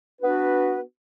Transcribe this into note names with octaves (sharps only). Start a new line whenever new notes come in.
B3 D4 F#4 B4